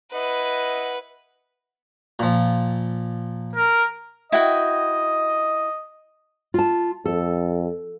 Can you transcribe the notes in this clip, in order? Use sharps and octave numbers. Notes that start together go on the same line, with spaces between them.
E4 B4 D#5 F#5
A#2 F3
A#4
E4 F#4 D#5 G5
F4 A5
F2 A4